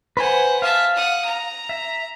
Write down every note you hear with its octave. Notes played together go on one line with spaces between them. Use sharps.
B4 C5 F#5 G#5
E5 F5 A5
F#5 D#6
A#5
E5